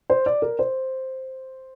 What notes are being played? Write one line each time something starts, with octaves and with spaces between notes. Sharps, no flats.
C5
D5
A#4
C5